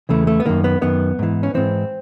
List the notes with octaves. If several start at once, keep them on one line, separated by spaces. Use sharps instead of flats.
E2 C#3 E3 A3
A3
B3
F#2 D#3 A#3
B3
F#2 D#3 B3
G#2 E3
C#4
G#2 E3 C4